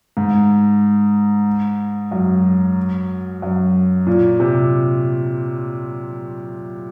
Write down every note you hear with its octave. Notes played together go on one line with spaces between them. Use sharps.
G#2
F#2
F#2
A#2
C3